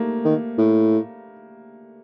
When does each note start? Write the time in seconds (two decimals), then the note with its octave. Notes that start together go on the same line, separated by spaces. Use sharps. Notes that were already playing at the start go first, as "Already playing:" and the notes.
Already playing: G3 A3 A#3
0.24 D#3
0.58 A2